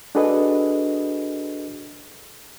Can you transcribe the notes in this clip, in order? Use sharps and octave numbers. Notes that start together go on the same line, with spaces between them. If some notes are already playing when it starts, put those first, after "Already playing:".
D4 F#4 G#4 A4 B4 D#5